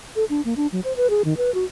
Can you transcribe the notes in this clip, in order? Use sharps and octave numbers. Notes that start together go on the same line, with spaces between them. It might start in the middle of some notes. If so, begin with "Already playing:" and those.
A4
D4
A#3
D4
F#3
C5
B4
G#4
D#3
B4
F#4